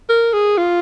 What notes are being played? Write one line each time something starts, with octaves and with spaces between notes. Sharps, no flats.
A#4
G#4
F4